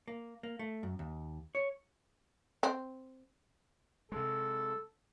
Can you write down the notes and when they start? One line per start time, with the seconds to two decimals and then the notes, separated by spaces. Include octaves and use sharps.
0.08 A#3
0.43 A#3
0.59 A3
0.83 F#2
0.99 D#2
1.55 C#5
2.63 C4
4.12 C3 G#3 A4